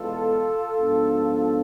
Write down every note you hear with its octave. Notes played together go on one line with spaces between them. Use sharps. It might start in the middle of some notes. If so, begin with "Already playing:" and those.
Already playing: E2 B2 G#3 B3 F4 A4
G#2 F3 B3 D4